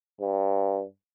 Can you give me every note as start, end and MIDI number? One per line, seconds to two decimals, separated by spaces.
0.21 0.84 43